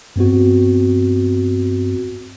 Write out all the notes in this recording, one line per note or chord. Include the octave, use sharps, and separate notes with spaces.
G2 B3 C4 F#4